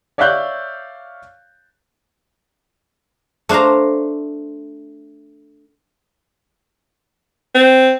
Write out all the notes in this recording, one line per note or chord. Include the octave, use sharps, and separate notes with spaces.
C#5 D5 E5 F5 F#6 G6
A3 D4 C5 F5 A#5
C4